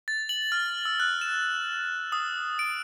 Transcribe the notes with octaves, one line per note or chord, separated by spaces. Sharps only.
A6
F#7
F6
E6
F#6
E7
D#6
D7